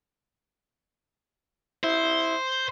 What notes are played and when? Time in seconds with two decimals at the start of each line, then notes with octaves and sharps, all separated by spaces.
1.84 E4 C5